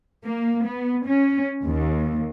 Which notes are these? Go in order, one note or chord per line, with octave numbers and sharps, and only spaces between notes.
A#3
B3
C#4
D#2